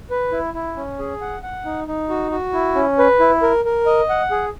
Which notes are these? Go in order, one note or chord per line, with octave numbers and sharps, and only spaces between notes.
B4
E4
E4
C#4
G#4
F#5
F#5
D#4
D#4
F#4
F#4
E4
C#4
B4
E4
A#4
A#4
D#5
F#5
G#4